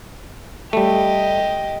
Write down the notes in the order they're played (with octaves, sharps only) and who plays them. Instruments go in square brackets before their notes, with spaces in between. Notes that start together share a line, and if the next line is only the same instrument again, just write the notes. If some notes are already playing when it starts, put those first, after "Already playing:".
[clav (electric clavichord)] G3 A3 [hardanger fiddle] G4 D#5